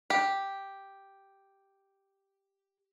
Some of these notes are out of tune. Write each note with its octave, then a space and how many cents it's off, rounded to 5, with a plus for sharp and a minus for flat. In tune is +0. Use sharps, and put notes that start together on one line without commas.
G4 +0